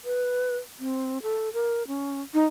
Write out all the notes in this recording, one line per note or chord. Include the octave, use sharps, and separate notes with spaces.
B4
C4
A4
A#4
C#4
D#4